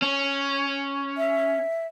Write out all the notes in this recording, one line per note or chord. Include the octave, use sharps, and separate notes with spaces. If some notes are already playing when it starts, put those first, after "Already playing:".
C#4
E5